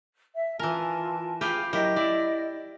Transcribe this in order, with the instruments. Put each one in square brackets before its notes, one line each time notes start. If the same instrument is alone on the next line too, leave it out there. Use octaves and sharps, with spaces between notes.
[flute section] E5
[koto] E3 A#4 [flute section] F4 G#5 A5
[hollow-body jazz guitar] F4 G#4 B4 [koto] G4 F5
[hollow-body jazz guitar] F#3 E4 A#4 [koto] G4 [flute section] D#5
[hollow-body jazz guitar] E4 [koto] D5